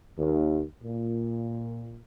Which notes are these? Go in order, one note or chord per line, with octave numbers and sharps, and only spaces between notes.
D#2
A#2